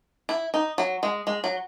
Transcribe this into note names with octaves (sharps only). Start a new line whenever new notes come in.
E4
D#4
F#3
G#3
G#3
F#3